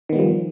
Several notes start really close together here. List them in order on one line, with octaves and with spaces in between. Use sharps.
D#3 B3 G3 F3